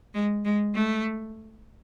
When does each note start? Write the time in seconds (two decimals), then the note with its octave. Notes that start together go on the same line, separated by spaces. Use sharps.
0.14 G#3
0.45 G#3
0.75 A3